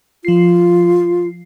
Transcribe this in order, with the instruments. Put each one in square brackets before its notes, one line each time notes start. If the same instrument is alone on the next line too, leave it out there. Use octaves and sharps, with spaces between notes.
[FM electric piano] F3 C7 [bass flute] F4